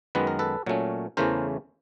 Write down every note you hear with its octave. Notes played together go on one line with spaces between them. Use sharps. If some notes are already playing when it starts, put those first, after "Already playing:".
F#2 D#3 G#3 B3 B4
A#4
A4 B4
A#2 F#3 A3 C#4
E2 C#3 E3 A3 C#4 A#4 C5